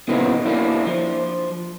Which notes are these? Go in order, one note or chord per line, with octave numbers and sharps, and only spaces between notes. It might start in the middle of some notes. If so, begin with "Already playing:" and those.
A#2 C#3 F3 B3 D#4 E4
A#3 D4 E4
F3